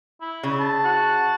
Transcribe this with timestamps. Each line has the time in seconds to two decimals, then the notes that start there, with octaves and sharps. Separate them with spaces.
0.21 E4
0.43 C#3
0.60 A5
0.84 F#4